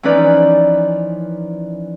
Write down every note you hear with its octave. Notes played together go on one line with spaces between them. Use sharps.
E3 F3 C#4 D#4 B4 D5